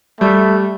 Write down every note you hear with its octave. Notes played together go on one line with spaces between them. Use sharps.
G3 A3